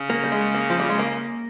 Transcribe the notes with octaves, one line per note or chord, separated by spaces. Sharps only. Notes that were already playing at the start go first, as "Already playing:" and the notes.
Already playing: C#3
A#3
G3
G#3
A#3
F3
G3
G#3
A#3